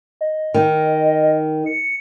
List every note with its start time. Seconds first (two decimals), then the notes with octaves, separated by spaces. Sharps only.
0.21 D#5
0.54 D#3
1.66 C#7